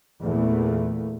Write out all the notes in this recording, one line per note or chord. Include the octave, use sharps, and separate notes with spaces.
E2 A#2 A3